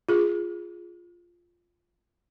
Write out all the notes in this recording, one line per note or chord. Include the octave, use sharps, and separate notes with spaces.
F4 G#4